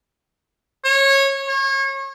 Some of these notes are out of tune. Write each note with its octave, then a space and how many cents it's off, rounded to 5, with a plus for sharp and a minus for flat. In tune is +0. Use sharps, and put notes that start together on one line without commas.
C#5 -20
C#5 -35